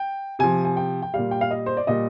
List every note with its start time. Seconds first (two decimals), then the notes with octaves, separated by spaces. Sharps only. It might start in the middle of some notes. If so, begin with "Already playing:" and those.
Already playing: G5
0.39 C3 F3 G#5
0.65 G#5
0.77 G5
1.02 G5
1.14 A#2 G3 F5
1.31 G5
1.41 F5
1.51 D#5
1.66 C5
1.77 D5
1.87 A#2 G3 D#5